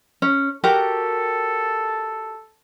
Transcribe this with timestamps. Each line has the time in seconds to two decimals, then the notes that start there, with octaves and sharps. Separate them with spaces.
0.22 C#4
0.64 F#4 G4 A4 A#4